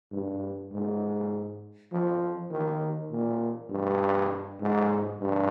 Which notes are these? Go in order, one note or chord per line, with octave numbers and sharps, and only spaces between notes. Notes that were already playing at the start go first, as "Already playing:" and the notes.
G2
G#2
F3
D#3
A#2
G2
G#2
G2